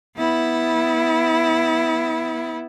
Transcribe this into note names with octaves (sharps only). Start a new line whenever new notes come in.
B3 E4